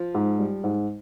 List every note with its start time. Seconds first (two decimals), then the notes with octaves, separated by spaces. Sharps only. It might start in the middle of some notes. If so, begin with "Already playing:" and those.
Already playing: F3
0.14 G#2
0.39 G3
0.64 G#2